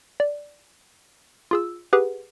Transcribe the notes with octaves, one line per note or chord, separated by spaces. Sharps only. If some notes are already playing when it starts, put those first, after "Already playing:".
D5
F4 G#4 E6
G4 G#4 B4 F#5